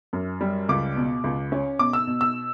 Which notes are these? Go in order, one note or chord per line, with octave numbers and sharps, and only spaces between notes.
F#2
G3
C#2 D6
B2
C#2
C#4
B2 D6
E6
B2
E6